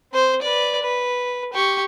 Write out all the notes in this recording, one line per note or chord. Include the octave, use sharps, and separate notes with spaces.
C4 C5
B4 D5
B4
G4 C#6